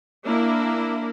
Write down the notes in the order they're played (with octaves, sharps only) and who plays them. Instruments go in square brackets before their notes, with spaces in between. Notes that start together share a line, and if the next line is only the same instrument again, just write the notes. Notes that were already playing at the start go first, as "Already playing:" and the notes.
[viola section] A#3 D4 E4 A#4